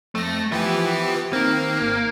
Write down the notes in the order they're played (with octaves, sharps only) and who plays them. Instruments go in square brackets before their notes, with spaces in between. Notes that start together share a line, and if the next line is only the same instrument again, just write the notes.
[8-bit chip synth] F2 A#6 [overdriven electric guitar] A3
[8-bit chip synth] F3 B3 G4 [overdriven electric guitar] B4 E5
[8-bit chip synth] D#3 C4 [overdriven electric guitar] A#3
[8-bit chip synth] G#1